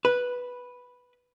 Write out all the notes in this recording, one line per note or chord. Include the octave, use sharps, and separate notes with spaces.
B4